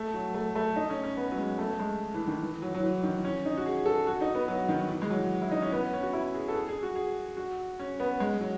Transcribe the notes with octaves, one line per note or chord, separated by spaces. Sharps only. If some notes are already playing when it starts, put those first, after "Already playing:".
Already playing: A3
F#3
A3
A3
D#4
C#4
C#4
B3
F#3
G#3
A3
G#3
E3
D#3
E3
F#3
F#3
E3
D#3
C#4
D#4
F#4
G#4
A4
F#4
D#4
B3
F#3
D#3
E3
G#3
F#3
E4
D#4
C#4
B3
C#4
F#4
E4
G#4
A4
G#4
G#4
F#4
G#4
F#4
C#4
B3
G#3
F#3